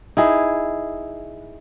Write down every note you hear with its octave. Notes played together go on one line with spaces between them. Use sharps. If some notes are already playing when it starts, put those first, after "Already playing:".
D#4 E4 G#4